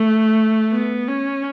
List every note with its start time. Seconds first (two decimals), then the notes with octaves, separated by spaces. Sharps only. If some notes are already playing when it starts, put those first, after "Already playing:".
Already playing: A3
0.72 B3
1.08 C#4